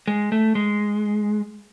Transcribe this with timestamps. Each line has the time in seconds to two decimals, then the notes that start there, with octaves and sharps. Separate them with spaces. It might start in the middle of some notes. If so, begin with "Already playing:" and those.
0.08 G#3
0.32 A3
0.55 G#3